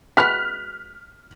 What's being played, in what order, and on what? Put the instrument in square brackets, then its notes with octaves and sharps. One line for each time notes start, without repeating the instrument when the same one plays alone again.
[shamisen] G#3 F#4 B4 [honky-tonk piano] F6 F#6 B6